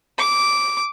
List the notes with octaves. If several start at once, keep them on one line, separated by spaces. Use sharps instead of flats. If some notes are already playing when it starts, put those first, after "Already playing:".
D6